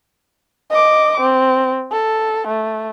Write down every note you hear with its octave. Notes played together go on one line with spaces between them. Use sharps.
D#5 D6
C4
A4
A3